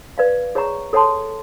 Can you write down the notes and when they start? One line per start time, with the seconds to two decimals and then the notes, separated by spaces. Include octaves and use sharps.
0.18 B4 D5 F5
0.55 G#4 C#5 F#5 A#5 C#6
0.93 A4 C#5 F#5 A5 C6